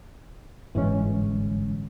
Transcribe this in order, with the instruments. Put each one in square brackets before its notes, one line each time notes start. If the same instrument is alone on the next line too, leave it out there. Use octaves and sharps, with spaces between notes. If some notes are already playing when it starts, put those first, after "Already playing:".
[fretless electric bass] G1 G#2 [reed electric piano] E3 G#3 C#4